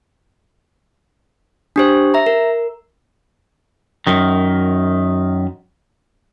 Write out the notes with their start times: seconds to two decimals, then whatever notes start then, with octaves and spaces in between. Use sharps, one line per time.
1.76 D4 G4 C5
2.14 E5 A#5
2.27 A#4
4.07 F#2 D#3